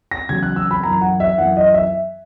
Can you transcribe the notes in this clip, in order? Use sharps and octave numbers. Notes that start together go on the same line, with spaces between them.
A#6
E2 C#3 F#3 G#6
F#6
E6
B5
F#2 E3 A#5
F#5
E5
F#2 E3 F#5
D#5
E5